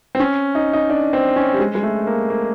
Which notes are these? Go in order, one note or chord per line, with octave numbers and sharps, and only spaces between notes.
C4
C#4
D#4
D#4
D4
C4
C#4
G3
G#3
G#3
A3
A#3
A#3